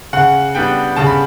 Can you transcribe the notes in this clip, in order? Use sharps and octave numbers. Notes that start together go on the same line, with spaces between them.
C#3 F#5
G3 B3 D4 G5
C#3 A5
B5